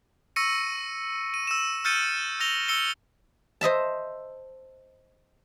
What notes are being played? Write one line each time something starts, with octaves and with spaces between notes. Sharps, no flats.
C#6 E6 A#6 C#7 D#7
D#7
E6 E7
E6 F6 G6 A6 C#7 D#7
E6 A#6 F7 G7
E6 C#7 G7
C5 D#5 E5 A5